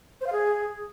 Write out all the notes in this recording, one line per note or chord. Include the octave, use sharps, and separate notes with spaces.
C5
F5
G#4